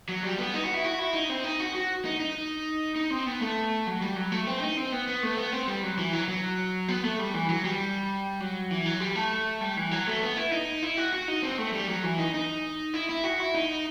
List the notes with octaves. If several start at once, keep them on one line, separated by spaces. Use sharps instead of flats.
F#3
G3
B3
D#4
F#4
E4
F#4
E4
D#4
C4
D#4
F#4
F#4
D#4
D#4
D#4
C4
B3
A3
F#3
G3
F#3
A3
C4
D#4
C4
B3
B3
A3
B3
C4
G3
F#3
E3
F#3
F#3
B3
A3
G3
E3
F#3
G3
F#3
E3
F#3
G3
A3
G3
E3
F#3
A3
B3
E4
D#4
E4
F#4
F#4
D#4
C4
A3
G3
F#3
E3
D#4
D#4
E4
E4
F#4
E4
D#4